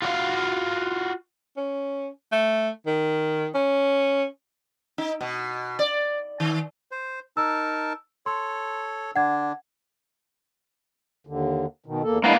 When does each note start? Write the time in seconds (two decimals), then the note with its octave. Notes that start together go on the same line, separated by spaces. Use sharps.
0.02 F4 F#4 C#5 F5
1.57 C#4
2.32 A3
2.86 D#3
3.55 C#4
4.98 D#4
5.21 B2
5.79 D5
6.40 D#3
6.91 C5
7.37 D#4 A#4 A5 E6
8.26 A4 C#5 C6
9.16 D3 D4 F#5 G#6
11.27 D#2 D3
11.86 B2 D#3
12.03 E2 A#3 A4
12.24 G#3 A#3 B3 D4 E4 F5